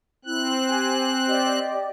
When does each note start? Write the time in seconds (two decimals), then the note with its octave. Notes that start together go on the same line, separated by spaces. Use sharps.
0.25 C4 E4 F#6
0.68 G4 G#5
1.27 G4 D5 D#5